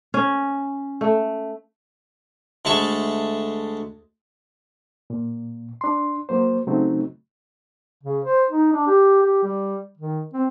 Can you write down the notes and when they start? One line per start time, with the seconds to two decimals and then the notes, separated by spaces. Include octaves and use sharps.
0.14 C#4
1.01 A3
2.65 D2 G#3 A3 C#5 A5 C#6
5.10 A#2
5.81 D4 C6
6.29 F#3 A#3 C5
6.67 C#3 F#3 A3 C4 D#4
8.03 C#3
8.25 C5
8.50 D#4
8.72 D4
8.87 G4
9.22 G4
9.43 G3
9.97 D#3
10.34 C4